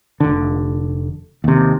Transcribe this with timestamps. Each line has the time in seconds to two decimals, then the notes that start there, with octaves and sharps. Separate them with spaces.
0.20 F1 D3
1.44 D#2 C3